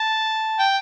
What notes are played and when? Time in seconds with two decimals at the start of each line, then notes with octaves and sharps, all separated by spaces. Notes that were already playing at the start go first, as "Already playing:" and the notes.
Already playing: A5
0.59 G5